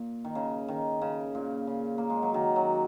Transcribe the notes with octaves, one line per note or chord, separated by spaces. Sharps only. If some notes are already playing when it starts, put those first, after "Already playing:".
Already playing: A#2
D#3
C#3
D#3
C#3
A#2
C#3
A#3
G#3
F#3
D#3
F#3